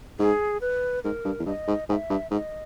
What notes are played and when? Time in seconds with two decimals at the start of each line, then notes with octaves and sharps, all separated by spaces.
0.19 G#2 G#4
0.61 B4
1.04 G#2 A#4
1.25 G2
1.40 E2
1.46 G2 D#5
1.68 G#2
1.89 G#2 G#5
1.93 E5
2.10 G2
2.31 G#2 D#5